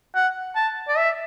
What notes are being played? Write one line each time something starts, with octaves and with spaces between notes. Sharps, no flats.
F#5
A5
D5
E5